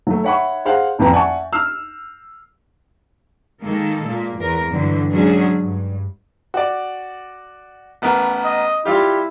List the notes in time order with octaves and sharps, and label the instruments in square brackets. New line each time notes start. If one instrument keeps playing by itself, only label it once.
[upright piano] F#3 A3
C#5 E5 F#5 B5 C#6
G#4 C5 F5 F#5
A1 F2 B4 G5 A#5
D5 E5 F#5 G#5 A5 C#6
E6 F6 C7
[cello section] D#3 G#3 A#3 A4
A#2 A#3
E2 A#4
G2 D3 E3 F#3 G3
F#3 G#3 C#4 D4 F#4 G#4
G2
[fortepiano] F#4 D5
A1 B3 A#4
[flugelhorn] D#5
[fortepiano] G3 F4 G4 [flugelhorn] E4